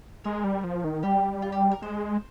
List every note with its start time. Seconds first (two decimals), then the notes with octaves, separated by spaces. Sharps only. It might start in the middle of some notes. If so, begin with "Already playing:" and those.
0.24 G#3 A#4
0.44 G3
0.64 F3
0.84 D#3
1.03 G3 G4
1.42 F4
1.52 G4
1.71 A#4
1.82 G#3 C5